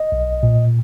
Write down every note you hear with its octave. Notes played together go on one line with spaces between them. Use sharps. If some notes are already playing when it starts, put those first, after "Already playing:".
Already playing: D#5
B1
A#2